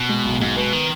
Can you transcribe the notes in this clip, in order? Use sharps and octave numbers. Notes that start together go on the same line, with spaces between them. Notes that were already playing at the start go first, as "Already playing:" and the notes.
Already playing: B2
G#3
B1
G#2 G#3
B2 B3
D#3